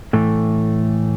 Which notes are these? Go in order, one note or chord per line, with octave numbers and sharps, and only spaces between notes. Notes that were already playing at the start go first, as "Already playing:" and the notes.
A2 E3 A3